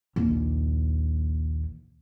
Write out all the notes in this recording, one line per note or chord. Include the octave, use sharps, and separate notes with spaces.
A#1 D#2